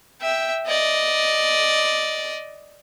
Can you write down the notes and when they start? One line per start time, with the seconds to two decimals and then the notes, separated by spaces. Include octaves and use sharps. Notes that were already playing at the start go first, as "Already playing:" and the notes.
0.21 E5 G5
0.67 D5 D#5